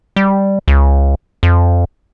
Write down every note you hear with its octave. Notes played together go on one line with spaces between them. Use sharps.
G3
C#2
F2